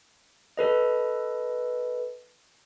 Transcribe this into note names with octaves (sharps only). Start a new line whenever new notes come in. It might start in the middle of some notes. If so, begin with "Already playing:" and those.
A4 B4 D#5